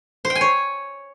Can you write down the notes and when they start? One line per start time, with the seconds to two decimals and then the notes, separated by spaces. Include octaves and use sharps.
0.25 C5
0.30 G5
0.35 G#5
0.41 C#5